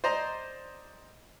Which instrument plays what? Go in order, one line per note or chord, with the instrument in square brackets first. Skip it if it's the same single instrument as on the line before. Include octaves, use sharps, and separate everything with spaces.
[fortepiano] C5 D5 D#5 A#5